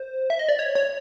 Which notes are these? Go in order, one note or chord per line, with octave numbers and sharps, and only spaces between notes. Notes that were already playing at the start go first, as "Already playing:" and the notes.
Already playing: C5
E5
D#5
D5
C#5
C#5